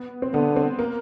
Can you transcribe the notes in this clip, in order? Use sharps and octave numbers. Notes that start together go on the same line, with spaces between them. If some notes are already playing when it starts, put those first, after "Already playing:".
Already playing: B3
C4
D3 B3
C4
A#3